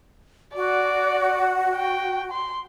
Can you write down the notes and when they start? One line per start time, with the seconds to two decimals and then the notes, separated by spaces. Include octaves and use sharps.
0.56 F#4 D5
1.76 G5
2.32 C6